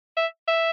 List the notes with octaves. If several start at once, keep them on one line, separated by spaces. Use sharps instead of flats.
E5
E5